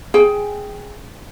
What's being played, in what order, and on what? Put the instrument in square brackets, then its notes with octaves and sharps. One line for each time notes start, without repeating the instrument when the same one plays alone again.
[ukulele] G#4 G5